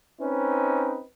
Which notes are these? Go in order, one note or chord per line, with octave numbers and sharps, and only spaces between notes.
C4 C#4 D#4 B4